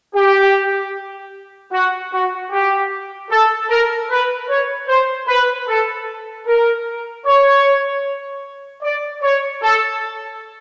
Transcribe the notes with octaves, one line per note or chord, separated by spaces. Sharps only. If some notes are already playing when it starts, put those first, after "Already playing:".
G4
F#4
F#4
G4
A4
A#4
B4
C#5
C5
B4
A4
A#4
C#5
D5
C#5
A4